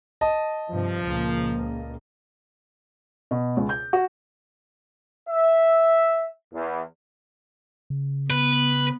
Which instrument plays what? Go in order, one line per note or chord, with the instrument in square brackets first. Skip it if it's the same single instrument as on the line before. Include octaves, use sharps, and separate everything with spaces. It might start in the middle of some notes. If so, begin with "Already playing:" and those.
[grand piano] D#5 A5
[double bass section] G2 C3 [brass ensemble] F3
[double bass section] C#2 A#2 A#3
[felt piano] B2
C#2
G6
F#4
[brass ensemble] E5
E2
[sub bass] C#3
[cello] B3 [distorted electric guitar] B4